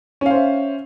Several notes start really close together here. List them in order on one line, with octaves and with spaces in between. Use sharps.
C#4 F5 C5 E5